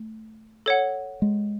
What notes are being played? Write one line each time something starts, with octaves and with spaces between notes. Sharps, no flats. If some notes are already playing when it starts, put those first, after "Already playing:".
Already playing: A3
A4 C#5 F#5
G#3